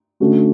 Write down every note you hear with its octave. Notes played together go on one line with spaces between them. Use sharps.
D3 A3 C#4 F#4